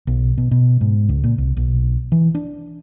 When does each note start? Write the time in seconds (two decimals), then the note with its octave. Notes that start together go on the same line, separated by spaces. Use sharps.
0.07 B1
0.38 B2
0.51 B2
0.81 G#2
1.09 C#2
1.23 A#2
1.38 C2
1.57 B1
2.12 E3
2.35 D4